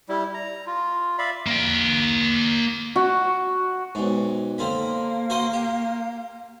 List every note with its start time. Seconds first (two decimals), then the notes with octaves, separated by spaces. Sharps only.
0.09 G3 E4
0.34 A#5
0.67 F4
1.18 D5 E5 F5 B5
1.47 A#3 G5
2.96 F#4
3.95 B1 G#2
4.58 D3 A#3 C4 B5
5.30 F#4 C5 D#5
5.53 G4